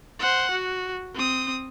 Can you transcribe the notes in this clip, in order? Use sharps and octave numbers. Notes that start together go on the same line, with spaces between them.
C5 F#5
F#4
C4 D#6